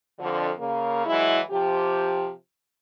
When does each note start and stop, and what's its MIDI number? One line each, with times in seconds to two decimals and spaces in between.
0.18 0.49 41
0.18 0.49 50
0.59 1.03 49
0.59 1.03 58
1.06 1.39 52
1.06 1.39 54
1.06 1.39 56
1.06 1.39 64
1.51 2.31 48
1.51 2.31 53
1.51 2.31 67